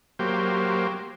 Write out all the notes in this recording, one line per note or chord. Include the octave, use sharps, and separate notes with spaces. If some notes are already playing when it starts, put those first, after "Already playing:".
F#3 A#3 G4 C5